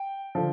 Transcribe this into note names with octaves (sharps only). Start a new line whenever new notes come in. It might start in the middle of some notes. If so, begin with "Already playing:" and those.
Already playing: G5
D3 F3